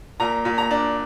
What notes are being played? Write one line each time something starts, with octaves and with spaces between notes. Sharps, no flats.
A#2 A#5
A#2
A#5
D4